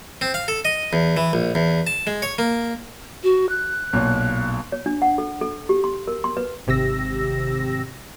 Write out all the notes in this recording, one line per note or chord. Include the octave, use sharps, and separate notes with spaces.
C4
F5
A4
D#5
E2
E3
A#1
E2
A5
G#3
C#5
A#3
F#4
F#6
B1 A#2
C#5
D4
F#5
A4
A4
G4
C6
A#4
C6
B4
G#1 C3 G4 E6 A#6